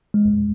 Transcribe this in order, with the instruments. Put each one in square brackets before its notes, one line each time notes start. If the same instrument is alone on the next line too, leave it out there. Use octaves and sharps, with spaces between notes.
[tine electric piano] G#3